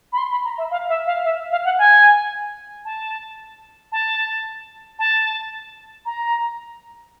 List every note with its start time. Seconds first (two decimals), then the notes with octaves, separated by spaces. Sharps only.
0.12 B5
0.17 C6
0.31 B5
0.44 A#5
0.58 E5
0.71 F5
0.88 E5
1.06 F5
1.24 E5
1.51 F5
1.64 F#5
1.78 G#5
2.85 A5
3.92 A5
4.99 A5
6.05 A#5